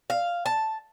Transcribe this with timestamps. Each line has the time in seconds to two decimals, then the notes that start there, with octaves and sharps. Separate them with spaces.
0.10 F5
0.46 A5